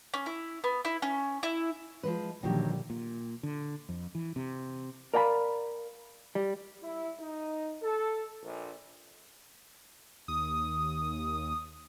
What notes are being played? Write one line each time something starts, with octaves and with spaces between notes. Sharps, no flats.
C#4
E4
B3
E4
C#4
E4
F3 G#3 B4
A#1 D3 D#3 F#3 G3 G4
A#2
D3
F2
E3
C3
A#4 D5 F5 G5 B5
G3
E4
D#4
A4
A#1
D#2 D#6